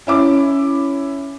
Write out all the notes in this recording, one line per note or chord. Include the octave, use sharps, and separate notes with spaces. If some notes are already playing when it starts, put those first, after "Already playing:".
C#4 E4 D6